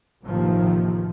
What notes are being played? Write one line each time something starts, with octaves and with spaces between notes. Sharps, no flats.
A1 D#2 C3 D#3 F3